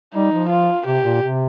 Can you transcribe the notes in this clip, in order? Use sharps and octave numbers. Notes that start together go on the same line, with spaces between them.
G3 D#4
F3
F4
C3 G4
A#2
C3